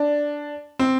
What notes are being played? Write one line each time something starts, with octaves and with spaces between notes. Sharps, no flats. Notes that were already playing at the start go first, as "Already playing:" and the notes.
Already playing: D4
C4